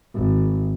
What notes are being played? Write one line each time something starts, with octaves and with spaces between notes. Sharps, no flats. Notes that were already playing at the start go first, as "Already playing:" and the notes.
G#1